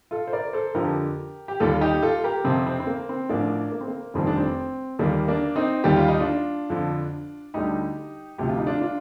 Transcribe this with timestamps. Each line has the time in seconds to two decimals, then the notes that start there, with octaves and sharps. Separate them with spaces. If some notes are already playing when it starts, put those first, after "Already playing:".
0.11 F4 A4
0.27 C5
0.33 A#4 D5
0.53 A4 C5
0.75 F2 D3 F3 G4 A#4
1.48 G4
1.60 D#2 D#3 G3 F4 A4
1.81 D#4 G4
2.03 F4 A4
2.24 G4 A#4
2.44 F2 C3 F3 C4
2.67 C4
2.80 C4
2.87 A#3
3.09 C4
3.29 A1 A2 F3 A#3 D4
3.72 A#3
3.81 C4
3.88 A#3
4.14 F1 F2 D#3 G3 C4
4.27 D4
4.37 C4
4.99 D#2 D#3 G3 A#3
5.28 A#3 D4
5.56 C4 D#4
5.84 D#2 D#3 G3 G4
5.97 F4
6.08 D#4
6.20 D4 F4
6.70 F2 D3 F3
7.54 D2 D3 G3 D#4 G4
8.38 D2 C3 F3 G4
8.49 F4
8.58 D#4
8.66 D4 F4
8.81 D4 F4